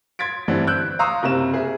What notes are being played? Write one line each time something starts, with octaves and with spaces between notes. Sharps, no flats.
C6 G#6 A6 B6 D7
G2 D3 E3 C4 D4 E4
E6 F#6 G6 D7
F5 A#5 C6 C#6 D#6 E6
F#1 C3 A#3 C4 E7
G#4 E5